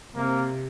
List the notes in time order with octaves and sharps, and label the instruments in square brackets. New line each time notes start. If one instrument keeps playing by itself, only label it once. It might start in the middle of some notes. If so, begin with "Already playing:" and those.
[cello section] C3 [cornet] A#3